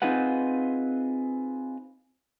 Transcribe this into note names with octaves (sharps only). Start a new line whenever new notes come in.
C4 D#4 F4 G#4 B4 F#5